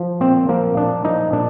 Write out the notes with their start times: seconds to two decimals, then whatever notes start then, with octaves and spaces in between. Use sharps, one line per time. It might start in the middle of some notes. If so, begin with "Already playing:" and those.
Already playing: F3
0.20 A#2 C4
0.49 F3 A#3
0.76 A#2 D4
1.05 F3 D#4
1.32 A#2 D4